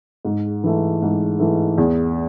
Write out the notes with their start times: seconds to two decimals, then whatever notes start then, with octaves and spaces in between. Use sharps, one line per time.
0.25 G#2
0.64 E3 A3
1.02 G#2
1.39 E3 A3
1.78 E2